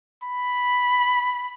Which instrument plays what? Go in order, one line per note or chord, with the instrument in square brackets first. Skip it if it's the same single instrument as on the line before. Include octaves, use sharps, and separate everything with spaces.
[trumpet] B5